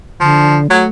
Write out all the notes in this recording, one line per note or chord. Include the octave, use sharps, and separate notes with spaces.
D3 F3
F#3 A3